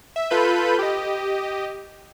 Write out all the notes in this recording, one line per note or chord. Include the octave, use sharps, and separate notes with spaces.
E5
F4 A4 B4 B5 G6 D#7
G4 D#5